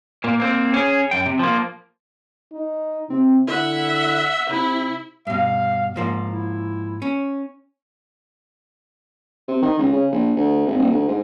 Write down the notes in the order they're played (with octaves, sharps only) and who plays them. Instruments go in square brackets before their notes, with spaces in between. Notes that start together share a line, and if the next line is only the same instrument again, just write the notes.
[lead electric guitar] A#2 A#3
A#3 C4
C#4 G#4
F#2 G5
C3
F3 A#3
[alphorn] D#4
[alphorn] C3 [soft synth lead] C4
[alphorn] D3 [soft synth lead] E4 [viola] E5 F#5
[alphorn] C3 [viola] E4 [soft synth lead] B5
[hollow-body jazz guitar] G2 B2 [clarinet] F5
[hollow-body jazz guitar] G#2 F3 A#3
[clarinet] E4
[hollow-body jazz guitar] C#4
[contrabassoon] C3
D#3
C#2
C#3
A#1
D2
G#1
D#1
D2
G#2